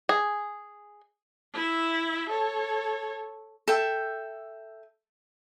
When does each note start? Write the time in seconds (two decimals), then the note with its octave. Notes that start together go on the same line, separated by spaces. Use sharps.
0.09 G#4
1.53 E4 E5
2.29 A4 C#5
3.68 A4 E5 G5